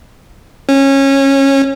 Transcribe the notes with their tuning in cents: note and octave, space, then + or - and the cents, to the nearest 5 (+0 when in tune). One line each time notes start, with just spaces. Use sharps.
C#4 -20